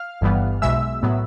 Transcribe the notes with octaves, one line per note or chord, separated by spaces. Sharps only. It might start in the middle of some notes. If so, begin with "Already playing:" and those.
Already playing: F5 F6
G1 G2 E3 G3 B3
B1 B2 G#3 E5 E6
A2 F#3 B3